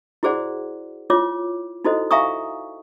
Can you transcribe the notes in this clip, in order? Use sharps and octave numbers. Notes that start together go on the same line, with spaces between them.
E4 F#4 G#4 C5 D5 F#5
E4 F4 C#5 D6
D#4 E4 F#4 A4 C5 D#5
E5 F5 G#5 A#5 C#6 D#6